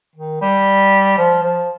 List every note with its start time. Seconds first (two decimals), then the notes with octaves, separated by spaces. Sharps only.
0.16 D#3
0.41 G3
1.18 F3
1.43 F3